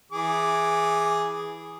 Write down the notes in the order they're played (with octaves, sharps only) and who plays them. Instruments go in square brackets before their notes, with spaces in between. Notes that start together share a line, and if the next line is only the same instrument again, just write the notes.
[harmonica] E3 G#4 D6